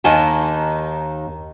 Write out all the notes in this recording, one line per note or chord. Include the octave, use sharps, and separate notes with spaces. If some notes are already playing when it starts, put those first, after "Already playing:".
D#2 D#3 G#5 A5